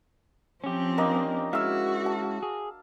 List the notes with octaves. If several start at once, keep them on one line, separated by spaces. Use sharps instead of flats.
F3 C4 C#4 G4
A#3 D4 D#5
G#3 C#4 E4 F#4 F5 E6
A5
G#4